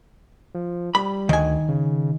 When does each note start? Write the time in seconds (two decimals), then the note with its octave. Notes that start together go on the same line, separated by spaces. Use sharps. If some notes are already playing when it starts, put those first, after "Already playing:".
0.55 F3
0.95 G3 B5
1.29 D2 D#3 G#5
1.69 C#3